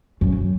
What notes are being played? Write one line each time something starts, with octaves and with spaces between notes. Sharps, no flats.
F#2